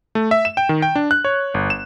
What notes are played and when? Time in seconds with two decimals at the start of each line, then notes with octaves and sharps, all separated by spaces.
0.15 A3
0.31 E5
0.45 E7
0.57 G5
0.69 D#3
0.82 G5
0.95 D4
1.11 F#6
1.25 C#5
1.54 G1
1.70 E7